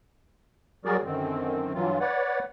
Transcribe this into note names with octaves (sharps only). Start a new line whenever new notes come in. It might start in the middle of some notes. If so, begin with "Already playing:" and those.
F#3 G3 F#4 G#4 A#4 D5
F#2 D3 D#3 C4
G2 E3 F#3 F4
B4 C#5 D5 F#5